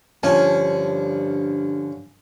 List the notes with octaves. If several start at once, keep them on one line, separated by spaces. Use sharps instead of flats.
G2 D3 F3 C#4 G#5 A5